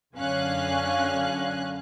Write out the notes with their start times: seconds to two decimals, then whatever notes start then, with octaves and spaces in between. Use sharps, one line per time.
0.16 F#2 D3 C#4 F5 G#5 F#6